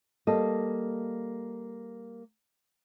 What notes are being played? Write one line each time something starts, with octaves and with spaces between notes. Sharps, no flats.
G3 A#3 A4 D#5